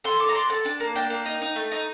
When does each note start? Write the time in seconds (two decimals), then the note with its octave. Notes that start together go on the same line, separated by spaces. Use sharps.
0.04 A4 C6
0.20 A4 D6
0.29 A#5
0.35 D4 C6
0.50 A4 A5
0.65 D4 A5
0.80 A#3
0.95 D4 G5
1.10 A#3
1.25 D#4
1.42 D#4
1.56 A3
1.72 D#4